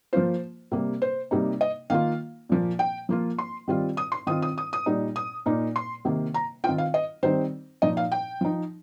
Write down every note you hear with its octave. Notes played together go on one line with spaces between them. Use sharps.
F3 A#3 F4 C5
C3 G3 A#3
C5
C3 G3 A#3 D#4
D#5
D#3 A#3 F4 F5
A#2 F3 A#3
G5
F3 A#3 F4
C6
D#3 G3 C4 F4
D#6
C6
D#3 C4 F4 D#6
D#6
D#6
D#6
A#2 G3 D#4
D#6
A#2 A#3 D#4
C6
C3 D#3 A#3
A#5
D#3 C4 F4 G5
F5
D#5
D#3 G3 C4 D#4 C5
A#2 F3 D#4 D#5
F5
G5
F3 D#4